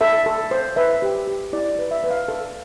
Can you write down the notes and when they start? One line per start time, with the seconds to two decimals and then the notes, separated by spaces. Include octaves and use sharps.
0.01 A4 E5
0.26 A4
0.51 C5
0.76 B4 E5
1.02 G4
1.27 G4
1.53 E4 D5
1.79 B4
1.91 E5
2.04 B4
2.10 F5
2.28 A4